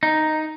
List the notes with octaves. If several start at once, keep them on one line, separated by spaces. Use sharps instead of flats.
D#4